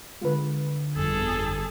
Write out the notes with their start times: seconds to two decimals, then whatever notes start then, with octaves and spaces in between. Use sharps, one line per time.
0.21 D3 G#3 F4 B4
0.96 G1 F2 G#4 A4